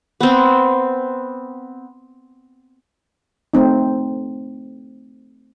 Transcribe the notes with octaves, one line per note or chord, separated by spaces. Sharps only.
B3 C4
A3 C4 D#4